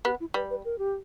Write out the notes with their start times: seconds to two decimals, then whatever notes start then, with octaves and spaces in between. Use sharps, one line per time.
0.05 B3 G4
0.20 E4
0.34 G3 B4
0.50 B4
0.65 A#4
0.79 G4